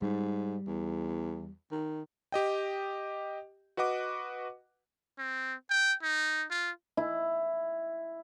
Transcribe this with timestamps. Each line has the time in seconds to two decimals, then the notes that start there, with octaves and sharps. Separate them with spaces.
0.02 G#2 G3
0.67 E2
1.71 D#3
2.32 G4 D#5 G5
3.77 F#4 B4 D#5 F#5 D6
5.18 C4
5.70 G5
6.02 D#4
6.51 F4
6.97 E4